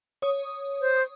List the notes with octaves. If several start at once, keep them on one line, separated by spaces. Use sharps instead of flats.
C#5 D#6
C5